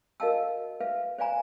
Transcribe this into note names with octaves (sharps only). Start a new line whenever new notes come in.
F#4 A#4 D#5 F5 A5 E6
B4 E5 F5
C5 D5 F5 G#5 A#5